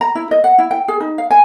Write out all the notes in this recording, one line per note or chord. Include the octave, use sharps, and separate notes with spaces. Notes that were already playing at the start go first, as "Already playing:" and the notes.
A#5
E4
D#5
F#5
E4
G5
G#4
D#4
F5
G#5